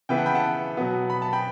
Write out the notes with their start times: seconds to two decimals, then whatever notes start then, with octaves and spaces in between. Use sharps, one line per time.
0.09 C#3 E3 B3 E5 G5
0.17 F#5 A5
0.26 G5 B5
0.35 F#5 A5
0.77 B2 F#3 B3
1.10 B5
1.22 A5
1.33 G5 B5